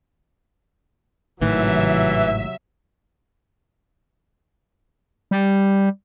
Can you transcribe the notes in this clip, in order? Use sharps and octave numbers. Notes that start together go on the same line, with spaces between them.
G#1 A2 C3 D#3 E3 F#3 E5
G3